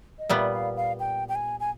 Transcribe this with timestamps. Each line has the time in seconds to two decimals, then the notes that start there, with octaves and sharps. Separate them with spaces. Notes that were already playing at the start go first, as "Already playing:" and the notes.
0.19 D#5
0.29 A#2 G3 B3 E5
0.53 F5
0.76 F5
1.00 G5
1.29 G5
1.35 G#5
1.60 G#5